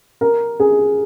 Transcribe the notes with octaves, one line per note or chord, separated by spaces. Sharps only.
A#4
G#4